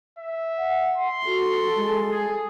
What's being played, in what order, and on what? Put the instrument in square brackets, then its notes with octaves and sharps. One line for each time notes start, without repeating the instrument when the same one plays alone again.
[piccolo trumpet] E5
[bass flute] F#5
[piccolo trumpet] C6
[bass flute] F#4 [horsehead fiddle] A4
[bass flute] G#3
[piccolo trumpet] G#4